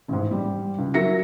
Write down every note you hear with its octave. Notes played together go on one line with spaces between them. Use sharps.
A1 G#2
G3
C#2
F#3 A#4 E5 A#6 C#7